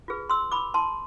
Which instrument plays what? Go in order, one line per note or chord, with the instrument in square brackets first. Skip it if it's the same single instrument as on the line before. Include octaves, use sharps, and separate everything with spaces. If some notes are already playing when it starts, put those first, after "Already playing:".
[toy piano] F4 G#4 B4
C6 E6
B5 D6
A5 C6